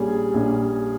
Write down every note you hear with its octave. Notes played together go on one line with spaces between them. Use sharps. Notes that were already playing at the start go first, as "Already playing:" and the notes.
Already playing: A#1 A#2 G3 C#4 G#4
A#1 A#2 G3 C#4